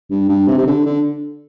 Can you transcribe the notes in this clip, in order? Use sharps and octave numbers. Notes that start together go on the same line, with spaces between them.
G2
G2
C3
C3
D3
D3